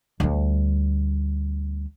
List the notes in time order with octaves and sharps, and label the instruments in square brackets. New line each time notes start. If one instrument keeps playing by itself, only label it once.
[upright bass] D2 G3